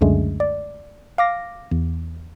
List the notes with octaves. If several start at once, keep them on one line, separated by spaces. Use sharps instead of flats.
C#2 F#2 D3 G#3 A3
D5
F5 D6 A#6
E2